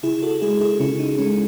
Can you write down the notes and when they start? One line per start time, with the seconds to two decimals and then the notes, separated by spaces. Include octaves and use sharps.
0.03 C#3 E4 G#4
0.22 F#4 A4
0.41 G#3 E4 G#4
0.61 E4 G#4
0.80 C#3 C#4 E4
0.99 D#4
1.18 G#3 C#4